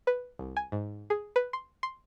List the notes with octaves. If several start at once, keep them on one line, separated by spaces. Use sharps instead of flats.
B4
C2
G#5
G#2
G#4
B4
C6
C6